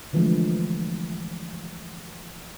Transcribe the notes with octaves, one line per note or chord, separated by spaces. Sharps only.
D3 E3 F3 G#3 A3